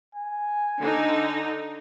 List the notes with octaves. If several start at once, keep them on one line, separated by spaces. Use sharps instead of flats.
G#5
D3 D#4